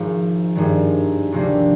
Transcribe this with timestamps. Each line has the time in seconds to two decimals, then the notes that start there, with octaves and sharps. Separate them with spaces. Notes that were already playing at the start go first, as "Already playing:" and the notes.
Already playing: G#1 G#2 F3
0.55 G#1 G2 D#3
1.32 D2 C3 F3 A#3 D4